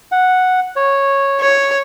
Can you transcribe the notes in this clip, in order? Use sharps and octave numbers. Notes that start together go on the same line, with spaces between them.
F#5
C#5
C#5